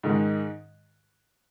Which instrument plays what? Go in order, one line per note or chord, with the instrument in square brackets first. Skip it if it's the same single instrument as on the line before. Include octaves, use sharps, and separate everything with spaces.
[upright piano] G#2 D#3 G#3